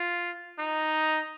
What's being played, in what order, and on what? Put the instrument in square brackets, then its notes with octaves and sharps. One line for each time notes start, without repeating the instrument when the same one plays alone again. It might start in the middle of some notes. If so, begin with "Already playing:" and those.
Already playing: [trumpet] F4
D#4